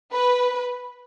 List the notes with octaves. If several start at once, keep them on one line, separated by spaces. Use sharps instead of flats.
B4